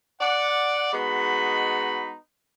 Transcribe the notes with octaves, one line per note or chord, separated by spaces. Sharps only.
D5 F#5
G#3 B3 D#4 F#4 B5